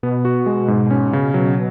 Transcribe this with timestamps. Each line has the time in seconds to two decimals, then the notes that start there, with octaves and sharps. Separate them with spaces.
0.03 B2 B3
0.25 F#4
0.46 G#3
0.68 G#2
0.91 C#4
1.13 C#3
1.34 B2 F#3